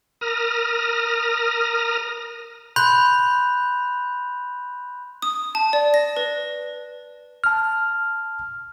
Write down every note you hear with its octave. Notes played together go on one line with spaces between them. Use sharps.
A#4 D#6 F6 A#6
B5 C6 F#6 G6 F7
D#6
A5
D5
A#6
B4
A5 F6